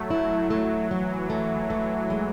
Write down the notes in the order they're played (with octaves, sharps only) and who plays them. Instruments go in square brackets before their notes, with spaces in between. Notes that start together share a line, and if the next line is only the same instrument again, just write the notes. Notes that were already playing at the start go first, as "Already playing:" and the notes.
Already playing: [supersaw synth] F#3 A3
[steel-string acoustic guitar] E4
[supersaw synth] F#3 [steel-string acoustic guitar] A3
[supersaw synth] E3 [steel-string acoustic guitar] F#3
[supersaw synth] F#3 [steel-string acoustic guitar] A3
[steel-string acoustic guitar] A3
G#3